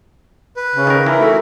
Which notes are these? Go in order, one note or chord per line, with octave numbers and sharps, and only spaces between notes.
B4
C#3 C#4
D#3 A#4
E3 D#4 E4 A#4
A3 F#4